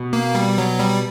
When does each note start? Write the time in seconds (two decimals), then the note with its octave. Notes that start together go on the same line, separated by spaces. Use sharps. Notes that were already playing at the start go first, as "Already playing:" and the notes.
Already playing: B2
0.13 A#3
0.35 G3
0.58 F#3
0.79 G3